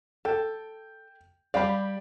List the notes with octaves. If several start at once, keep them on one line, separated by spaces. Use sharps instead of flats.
A4 G5
G3 G4 D5 F5 B5